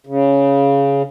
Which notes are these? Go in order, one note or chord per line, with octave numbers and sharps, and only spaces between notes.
C#3